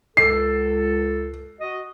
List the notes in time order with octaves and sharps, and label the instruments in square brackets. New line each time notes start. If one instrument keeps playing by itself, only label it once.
[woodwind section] C#2 A4 [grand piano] C7
[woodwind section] F#4 D#5